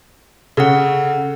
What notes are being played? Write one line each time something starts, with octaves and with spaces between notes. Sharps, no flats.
C#3 A4 F#5